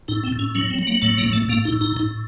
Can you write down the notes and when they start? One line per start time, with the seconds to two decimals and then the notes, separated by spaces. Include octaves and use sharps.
0.08 A2 D#4
0.23 C4
0.33 A2
0.39 C#4
0.55 F#3 C#4
0.70 C4
0.79 F#3
0.87 A#3
1.02 A2 A3
1.18 A#3
1.25 A2
1.33 A3
1.49 A2 A#3
1.65 D#4
1.72 A2
1.81 D#4
1.97 A2